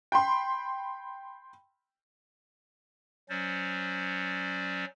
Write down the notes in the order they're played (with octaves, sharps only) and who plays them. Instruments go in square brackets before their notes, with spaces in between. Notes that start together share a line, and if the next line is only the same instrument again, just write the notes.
[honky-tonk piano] G5 B5 C6
[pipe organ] F#3 C#4 C5 D5